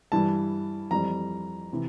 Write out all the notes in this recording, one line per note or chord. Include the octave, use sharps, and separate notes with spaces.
G2 E3 G3 A5
F2 E3 G3 C4 A#5
C3 E3